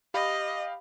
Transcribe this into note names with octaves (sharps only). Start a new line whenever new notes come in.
G4 D#5 F5 B5